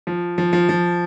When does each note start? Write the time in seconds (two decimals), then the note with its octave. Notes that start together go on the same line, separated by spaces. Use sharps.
0.07 F3
0.38 F3
0.53 F3
0.69 F3